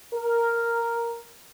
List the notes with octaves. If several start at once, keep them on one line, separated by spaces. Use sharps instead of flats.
A#4